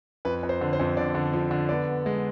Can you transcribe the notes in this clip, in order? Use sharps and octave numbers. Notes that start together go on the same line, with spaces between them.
F2 B4
F2
C5
D3
C5
F2
D3 D5
D3
F3
D3
B3 D5
B3
G#3